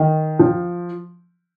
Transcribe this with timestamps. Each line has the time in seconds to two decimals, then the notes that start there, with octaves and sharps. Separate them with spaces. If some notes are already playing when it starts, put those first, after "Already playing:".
Already playing: D#3
0.39 F3